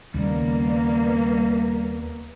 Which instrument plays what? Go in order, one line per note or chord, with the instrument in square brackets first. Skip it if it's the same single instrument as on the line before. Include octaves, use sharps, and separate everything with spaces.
[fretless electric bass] D#2 C#3 [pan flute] G3 [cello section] A#3 B3